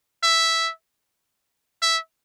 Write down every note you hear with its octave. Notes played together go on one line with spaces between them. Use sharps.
E5
E5